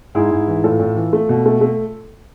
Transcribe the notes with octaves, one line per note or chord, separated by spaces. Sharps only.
G#2 E4 G#4
G#2
E3
A2 F4 A4
A2
E3
A3
B2
A3
A3